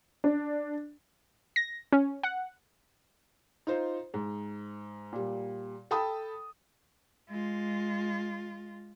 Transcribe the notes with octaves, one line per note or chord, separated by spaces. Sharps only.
D4
A#6
C#4
F#5
D#4 F4 C5
G#2
A#2 G3
A4 G5 A5 B5 D#6
G#3 F4